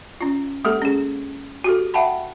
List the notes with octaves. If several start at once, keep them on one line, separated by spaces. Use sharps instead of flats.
C#4 F4
G#3 A#3 G4 A4
C#4 G#4
F#4 G4 A4
E5 F#5 G5 A5 B5